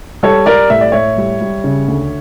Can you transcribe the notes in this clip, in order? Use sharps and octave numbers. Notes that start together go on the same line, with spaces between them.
G3 A4 C#5
G3 A#4 D5
A2 E5
D5
A2 C#5 E5
G3
G3
C#3
D2